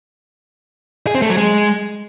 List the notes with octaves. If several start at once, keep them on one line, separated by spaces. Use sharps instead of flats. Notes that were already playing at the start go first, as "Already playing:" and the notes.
G#4
C4
A3
F#3
G#3